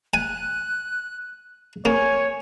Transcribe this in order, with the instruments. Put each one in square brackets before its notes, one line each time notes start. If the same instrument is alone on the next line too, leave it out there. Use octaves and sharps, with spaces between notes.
[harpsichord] G#5 [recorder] F#6
[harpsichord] A#3 [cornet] C#5 [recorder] G#5